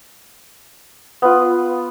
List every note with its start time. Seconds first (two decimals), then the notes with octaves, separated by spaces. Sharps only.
1.22 B3 F4